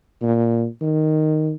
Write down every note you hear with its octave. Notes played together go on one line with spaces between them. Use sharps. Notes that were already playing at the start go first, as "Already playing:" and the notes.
A#2
D#3